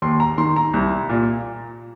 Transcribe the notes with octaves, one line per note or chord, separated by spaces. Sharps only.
D#2 C6
A#5
D#3 C6
A#5
C2
A#2